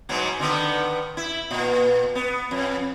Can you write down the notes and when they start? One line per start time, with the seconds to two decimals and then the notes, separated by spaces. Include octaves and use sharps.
0.09 G#2 B2 F#3
0.39 D3 D#3 B3
1.17 E4
1.51 A#2
2.15 B3
2.51 F2